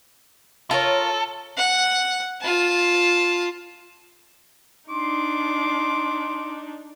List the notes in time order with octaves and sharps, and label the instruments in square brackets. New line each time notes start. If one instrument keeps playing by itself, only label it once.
[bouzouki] F4 A#4 C#5 [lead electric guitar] A4
[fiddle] F#5
F4 A5
[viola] D4 D#4 [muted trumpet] C6 [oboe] D6